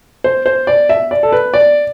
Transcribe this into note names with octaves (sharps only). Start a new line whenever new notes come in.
C5
C5
D5
E5
D5
A4
B4
D5